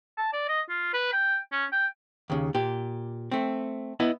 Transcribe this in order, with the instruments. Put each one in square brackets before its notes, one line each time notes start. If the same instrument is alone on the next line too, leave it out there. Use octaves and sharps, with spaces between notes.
[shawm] A5
D5
D#5
F4
B4
G5
C#4
G5
[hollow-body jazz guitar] D#2 C#3
A#2 G4
A3 C4
B3 E4 D#5